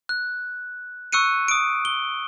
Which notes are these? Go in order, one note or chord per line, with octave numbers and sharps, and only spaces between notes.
F#6
C#6 E6 F#6 C#7 D#7
D#6 D7
G7